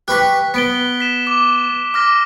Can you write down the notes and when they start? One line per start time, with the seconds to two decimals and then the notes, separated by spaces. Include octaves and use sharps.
0.08 G4 B4 C#6 F#6 B6
0.54 B3 B6 D7 G7
1.00 B6 E7
1.27 D6
1.94 D6 F6 A#6